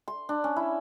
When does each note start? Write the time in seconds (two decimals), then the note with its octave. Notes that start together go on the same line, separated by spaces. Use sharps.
0.08 C6
0.29 D4
0.44 C#4
0.56 E4